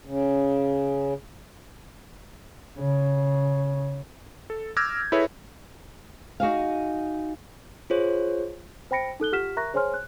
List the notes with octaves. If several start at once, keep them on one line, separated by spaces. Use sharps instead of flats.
C#3
C#3
A4
D6 E6 F6 G6 G#6 A#6
E4 G#4 A4 B4 C#5 E5
D#4 F#4 G#4 F5
F4 G#4 C5 C#5
C5 G5 B5 A#6 C#7 D7
D#4 A4 F#6 G7
F4 G4 F#5 F6 B6 E7
A#4 E5 A#5 C#6 F#6 A#6
G#4 C5 C#5 G#5 C6 F6
F#6